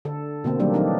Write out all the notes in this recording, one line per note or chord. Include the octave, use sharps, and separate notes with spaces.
D3 A4
B2 D3 A#3 C4
D#3 F#3 G3 A#3 D4
E3 F#3 C4 D4 D#4